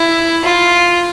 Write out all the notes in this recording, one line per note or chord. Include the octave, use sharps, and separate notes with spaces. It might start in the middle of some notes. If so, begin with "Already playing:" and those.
Already playing: E4
F4